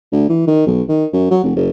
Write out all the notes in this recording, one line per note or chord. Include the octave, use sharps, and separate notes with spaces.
D2
E3
D#3
B1
D#3
F#2
F#3
F1
F#1